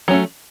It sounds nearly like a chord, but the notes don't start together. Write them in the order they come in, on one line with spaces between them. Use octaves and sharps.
F#3 C#4 A3